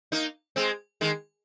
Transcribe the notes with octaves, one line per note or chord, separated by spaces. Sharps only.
A#3 D#4
G#3 C4
D#3 G#3